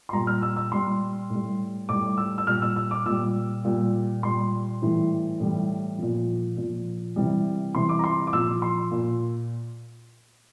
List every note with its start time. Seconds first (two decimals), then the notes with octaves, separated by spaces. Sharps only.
0.09 C6
0.13 A#2 G3 A#5
0.27 F6
0.42 E6
0.56 E6
0.72 A#2 G3 C6
1.30 A2 G3
1.89 A2 G3 D6
2.17 E6
2.38 E6
2.47 A#2 G3 F6
2.62 E6
2.76 E6
2.91 D6
3.06 A#2 G3 E6
3.65 A#2 G3
4.23 A#2 G3 C6
4.82 A2 E3 G3
5.40 A2 E3 G3
5.98 A#2 F3
6.57 A#2 F3
7.16 C3 E3 G3
7.74 C3 E3 G3 C6
7.89 D6
7.99 A#5
8.04 C6
8.27 D6
8.33 A#2 F3 E6
8.62 C6
8.91 A#2